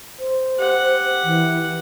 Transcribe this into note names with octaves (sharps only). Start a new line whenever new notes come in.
C5
G4 F#5
E3